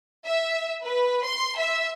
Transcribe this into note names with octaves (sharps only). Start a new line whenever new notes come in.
E5
B4
C6
E5